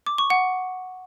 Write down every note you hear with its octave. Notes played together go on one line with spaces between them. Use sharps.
D6
C#6
F#5